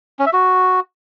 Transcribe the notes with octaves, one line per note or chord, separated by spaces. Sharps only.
C#4
E5
F#4